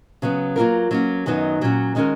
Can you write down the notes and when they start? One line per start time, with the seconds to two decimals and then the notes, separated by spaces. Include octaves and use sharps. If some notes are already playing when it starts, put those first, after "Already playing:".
0.22 C#3 F#3 B3
0.56 F#3 A#3 C#4 F4 A#4
0.91 F#3 A#3 C#4 F#4
1.26 F#2 D#3 F#3 B3 D#4
1.61 A#2 F#3 C#4 F#4
1.95 D#3 G#3 C#4 F#4 A#4